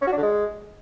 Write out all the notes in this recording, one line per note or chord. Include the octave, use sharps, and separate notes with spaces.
C#4
F#4
D4
D3
G#3